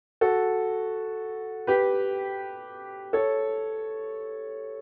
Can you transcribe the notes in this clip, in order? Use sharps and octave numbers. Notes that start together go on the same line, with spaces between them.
F#4 A4
G4 B4
A4 C#5